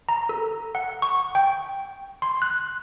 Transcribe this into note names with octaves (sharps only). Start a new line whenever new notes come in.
A#5
A4
F#5
C#6
G5
C6
F#6